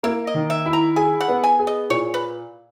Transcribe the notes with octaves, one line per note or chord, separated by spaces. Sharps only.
A#3 E4
D#5
D#3
E5
E4
A#5
G#4 G#5
F#5
B3
G#5
G#4
D#5
A#2 C#5
B4